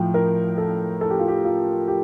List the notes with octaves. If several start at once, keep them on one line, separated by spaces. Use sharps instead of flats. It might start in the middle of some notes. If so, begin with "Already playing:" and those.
Already playing: A2 F3 G5
A#4
A4
A4
G4
F4
G4
F4
G4